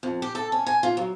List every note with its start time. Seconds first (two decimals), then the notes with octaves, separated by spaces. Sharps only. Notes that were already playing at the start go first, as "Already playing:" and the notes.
0.03 F2
0.22 G4
0.35 A4
0.52 C#4
0.67 G#5
0.83 F4
0.97 F#3